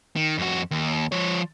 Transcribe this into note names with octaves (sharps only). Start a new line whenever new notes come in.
D#3
F2 F#4
D#2
F3 C#5